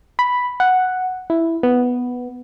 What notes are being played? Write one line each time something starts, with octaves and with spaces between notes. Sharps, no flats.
B5
F#5
E4
B3